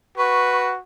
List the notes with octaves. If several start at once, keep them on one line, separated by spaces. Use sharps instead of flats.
F#4 B4 C#6